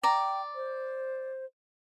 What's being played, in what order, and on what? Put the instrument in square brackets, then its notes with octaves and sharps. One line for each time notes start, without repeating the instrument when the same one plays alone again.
[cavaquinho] D5 A#5 [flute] G5
[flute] C5